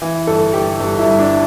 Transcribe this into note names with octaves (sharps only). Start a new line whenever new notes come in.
E3
G1 A4
G1 G4
G1
E4
G2
D4